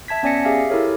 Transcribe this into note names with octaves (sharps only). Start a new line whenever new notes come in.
E5 A5 G#6 B6
B3 C#4 D5 G#5 A#6 C#7
G4 G#4 E5 F5
E4 G4 A4 A#4 C#5